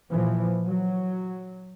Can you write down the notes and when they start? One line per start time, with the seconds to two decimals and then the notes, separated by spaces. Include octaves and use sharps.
0.11 A#2 E3 F3
0.66 F#3